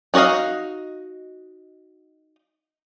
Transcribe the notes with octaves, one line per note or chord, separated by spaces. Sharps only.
D#4 F#4 D5 D#5 F5